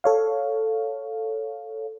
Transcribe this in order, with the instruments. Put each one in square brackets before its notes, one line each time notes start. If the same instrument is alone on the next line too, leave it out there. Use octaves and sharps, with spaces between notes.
[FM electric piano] A4 C#5 F5